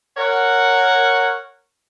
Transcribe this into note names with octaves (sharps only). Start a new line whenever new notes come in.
A#4 C#5 F#5